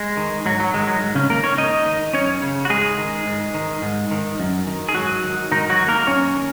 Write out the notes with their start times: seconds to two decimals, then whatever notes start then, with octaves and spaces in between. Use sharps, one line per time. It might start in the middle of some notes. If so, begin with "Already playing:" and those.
Already playing: G#3
0.17 D#3
0.45 G#2 F#3
0.60 F#3
0.74 D#3 G#3
0.87 F#3
1.01 G#2
1.15 C#3 C#4
1.30 D#3 A#3 A#4
1.44 C#4 C#5
1.58 G#2 D#4 D#5
1.86 D#3
2.13 F#2 C#4 C#5
2.42 C#3
2.65 F#4
2.70 G#2 G#3 G#4
2.98 D#3
3.26 G#2
3.54 D#3
3.82 G#2
4.11 D#3
4.40 F#2
4.67 D#3
4.89 G#4
4.95 G#2 F#3 F#4
5.24 D#3
5.51 G#2 D#3 D#4
5.69 F#3 F#4
5.80 D#3
5.88 A#3 A#4
6.07 F#2 C#4 C#5
6.36 D#3